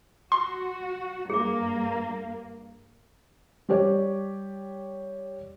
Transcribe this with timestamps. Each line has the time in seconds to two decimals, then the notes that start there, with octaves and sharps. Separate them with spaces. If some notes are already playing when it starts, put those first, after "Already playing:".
0.32 F#4 C6
1.30 G2 A#3 G#4 D6
3.69 G3 G4 C#5 D5